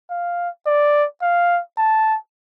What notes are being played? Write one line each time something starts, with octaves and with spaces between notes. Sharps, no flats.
F5
D5
F5
A5